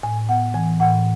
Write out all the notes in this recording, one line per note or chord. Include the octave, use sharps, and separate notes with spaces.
A2 G#5
B3 F#5
E3 G#5
A2 F#5